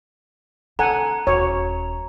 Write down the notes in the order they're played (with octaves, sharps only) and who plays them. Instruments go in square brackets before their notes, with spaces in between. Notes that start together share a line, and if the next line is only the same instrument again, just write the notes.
[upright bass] D3 C4 [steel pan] A4 F#5 G#5 [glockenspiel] A#5
[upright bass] D#1 [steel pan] F#4 C#5